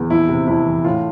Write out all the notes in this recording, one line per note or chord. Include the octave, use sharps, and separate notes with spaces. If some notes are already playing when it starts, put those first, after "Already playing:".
Already playing: E2
F2 E4
C3
F2 E4
E3
A2 F4